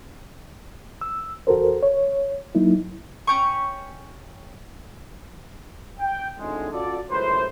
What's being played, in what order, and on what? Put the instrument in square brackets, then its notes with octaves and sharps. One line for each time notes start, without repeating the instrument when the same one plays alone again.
[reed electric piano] E6
E2 F#4 A4 A#4 C5
C#5
F#3 A#3 D#4 E4
[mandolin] C#4 G5 C#6
[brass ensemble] G5
G#1 A2 D3 G#3
C#4 F4 F#4 A4 D5
C#2 F#2 A2 B4 C5